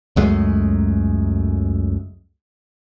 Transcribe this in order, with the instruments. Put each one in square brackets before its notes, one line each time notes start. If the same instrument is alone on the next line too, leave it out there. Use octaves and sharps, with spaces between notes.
[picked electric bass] C#2 F#2 G#3 A3